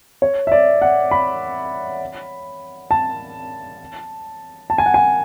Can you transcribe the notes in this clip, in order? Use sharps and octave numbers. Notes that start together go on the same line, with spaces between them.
C#5
E5
D5
F#5
B5
A5
A5
G#5
F#5
G#5